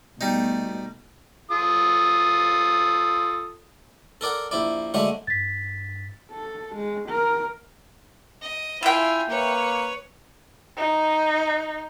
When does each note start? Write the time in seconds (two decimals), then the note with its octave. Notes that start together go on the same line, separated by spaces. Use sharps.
0.21 B2 G3 A3 D#4
1.51 F4 A4 D#6
4.21 A4 A#4 D5 F#5
4.51 A#1 E4 D5
4.94 D3 F#3 G#3 A3 D4
5.27 G2 A6 B6
6.32 A4
6.75 G#3
7.09 A#4
8.42 D#5
8.83 E4 F4 E5 G5 G#5
9.29 A#3 B4 C#5
10.77 D#4